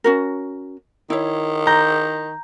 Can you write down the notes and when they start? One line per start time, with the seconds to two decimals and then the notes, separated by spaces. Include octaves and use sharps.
0.04 C#4 F#4 A#4
1.10 D#3 E4 C#5
1.67 A#5 G6